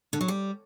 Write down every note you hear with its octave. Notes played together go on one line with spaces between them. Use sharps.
D3
F#3
G3